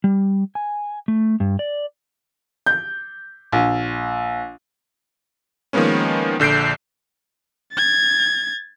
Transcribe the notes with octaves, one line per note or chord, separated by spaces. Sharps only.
G3
G#5
A3
G2
D5
G6
A#1
D#3 F3 G#3 A#3 B3 C#4
A#1 D3 G6 C7 D7
G#6 A6